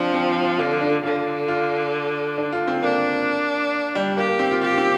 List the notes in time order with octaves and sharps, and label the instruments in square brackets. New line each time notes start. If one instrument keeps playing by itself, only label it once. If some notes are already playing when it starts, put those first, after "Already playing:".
Already playing: [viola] F3 [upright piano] C4 D4
[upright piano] C4
F4
F4
[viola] D3 [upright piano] F4
[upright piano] D4
[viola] D3 [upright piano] F4
[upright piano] F4
D4
F4
C4
[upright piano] A#3 [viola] D4
[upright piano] G3
[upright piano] A#3 [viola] G4
[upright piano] A#3
C4
F4
[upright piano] F4 [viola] G4
[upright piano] C4